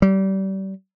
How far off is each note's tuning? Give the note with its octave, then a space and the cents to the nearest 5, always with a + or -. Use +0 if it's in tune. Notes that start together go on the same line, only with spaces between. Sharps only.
G3 -30